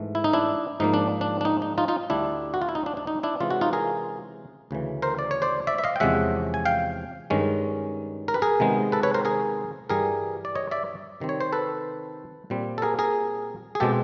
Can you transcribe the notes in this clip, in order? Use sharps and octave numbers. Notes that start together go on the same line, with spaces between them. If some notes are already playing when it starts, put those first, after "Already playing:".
Already playing: G#2 E3 A3
E4
D#4
D4 E4
G#2 F3 A#3 D#4
D4
D4
D4
D#4
D#4
D#4 F4
D#4 F4
D2 D3 G3 D4 E4
F#4
F4
E4
D#4
D4
D4
D#4
D4 E4
C3 E3 G#3 C#4 F4
F#4
D#4 F4
G#4 A#4
D2 C#3 E3
A#4 C5
D5
C#5
C5 D5
D5 E5
E5
D#5 F5
G5
E2 C3 F3 G#3 C#4 E5 F#5
G#5
F5 G5
G2 D#3 G#3 C#4
A#4
B4
G#4 A#4
C3 D#3 G#3 B3
A4 B4
B4 C#5
A#4 C5
G#4 A#4
G2 E3 G3 G#4 A#4
D5
C#5 D#5
D5 E5
C3 D#3 G3 C4
C#5
C5
A4 B4
A#2 G3 C4
A4
G#4 A#4
G#4 A#4
G#4
B2 G#3 C4 G4 A4